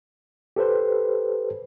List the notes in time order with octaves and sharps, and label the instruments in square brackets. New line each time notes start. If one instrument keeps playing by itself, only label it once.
[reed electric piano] G4 A4 B4 C5